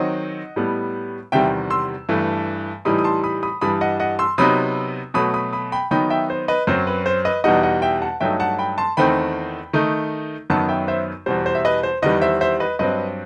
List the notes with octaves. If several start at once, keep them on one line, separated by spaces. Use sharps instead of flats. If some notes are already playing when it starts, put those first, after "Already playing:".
Already playing: D#3 F#3 C4 D#4 D#5 F#5
A2 G3 B3
E2 C3 D#3 G3 E5 G5
C6 E6
G2 E3 A3
A2 E3 G3 D#4 B5 D#6
D#6
A5 C6
B5 D#6
B5 D#6
G2 E3 G3 B5 D#6
D#5 F#5
D#5 F#5
C6 E6
C3 F#3 B3 D#4 B5 D#6
B2 F#3 A3 B5 D#6
B5 D#6
B5 D#6
G5 B5
D#3 F#3 B3 D#4 G5 B5
E5 G5
C5
B4 D#5
F#2 F#3 C4 C5
B4
C5
B4 D#5
E2 B2 G3 D#4 D#5 F#5
D#5 F#5
E5 G5
F#5 A5
G2 F#3 A3 D#4 E5 G5
F#5 A5
G5 B5
A5 C6
E2 D#3 A3 C4 D#4 G5 B5
D#3 A3 D#4
F#2 D#3 F#3 B3 D#4 F#5 A5
E5 G5
C5 E5
E2 B2 G3 C5
C5
E5
B4 D#5
C5
E2 D#3 G3 B4 D#5
C5 E5
C5 E5
B4 D#5
G2 F#3 C4 B4 D#5